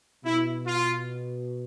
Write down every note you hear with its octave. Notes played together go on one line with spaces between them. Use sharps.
B2 E4
F4